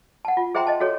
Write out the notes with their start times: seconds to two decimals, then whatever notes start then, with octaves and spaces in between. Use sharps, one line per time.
0.25 F#5 A5
0.37 F4
0.55 G#4 C5 E5 G5 A#5 C6
0.67 D#5 A5
0.80 F#4 G#4 A4 C#5